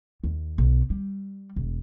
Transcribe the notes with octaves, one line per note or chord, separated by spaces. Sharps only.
D#2
B1
G3
E1